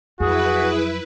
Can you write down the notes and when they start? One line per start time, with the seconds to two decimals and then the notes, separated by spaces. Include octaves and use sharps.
0.20 F2 F#3 E4 F#4 G#4 B4